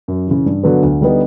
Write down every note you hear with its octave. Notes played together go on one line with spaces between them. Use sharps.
F#2
C#3 E3
G2
D3 F#3 B3
D2
D3 G3 B3 D#4